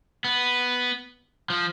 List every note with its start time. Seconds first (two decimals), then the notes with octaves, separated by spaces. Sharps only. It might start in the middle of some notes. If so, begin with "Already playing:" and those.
0.24 B3
1.50 F3